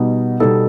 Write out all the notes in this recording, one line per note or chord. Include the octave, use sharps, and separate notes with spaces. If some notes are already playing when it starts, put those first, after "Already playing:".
Already playing: B2 G3 B3 D#4
B2 G3 B3 D#4 A4